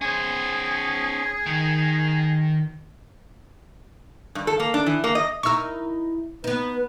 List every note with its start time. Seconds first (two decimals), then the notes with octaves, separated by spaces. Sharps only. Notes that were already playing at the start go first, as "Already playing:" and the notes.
0.01 C#4 G#4 C5
1.46 D#3
4.35 G2
4.47 A4
4.60 A#3
4.74 D4
4.86 E3
5.04 A#3
5.15 D#5
5.43 D#4 E4 A#4 C#6 E6
6.44 B3 D#4 B4